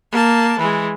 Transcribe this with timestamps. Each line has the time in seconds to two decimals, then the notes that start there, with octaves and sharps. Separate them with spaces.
0.12 A#3 A5
0.59 E3 G#3